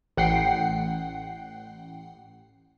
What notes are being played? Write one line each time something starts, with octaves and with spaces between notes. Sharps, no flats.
A1 F#5 G5 C7